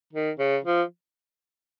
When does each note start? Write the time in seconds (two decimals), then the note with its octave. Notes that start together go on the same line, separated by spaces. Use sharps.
0.13 D#3
0.39 C#3
0.64 F3